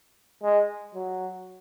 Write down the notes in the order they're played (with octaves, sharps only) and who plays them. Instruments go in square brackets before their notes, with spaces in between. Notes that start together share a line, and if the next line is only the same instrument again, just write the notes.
[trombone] G#3
F#3